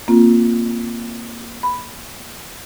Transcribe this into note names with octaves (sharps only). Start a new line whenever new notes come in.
A#3 C4 F4
B5